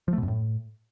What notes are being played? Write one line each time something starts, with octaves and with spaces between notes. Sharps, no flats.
F3
A3
B2
F#2
A2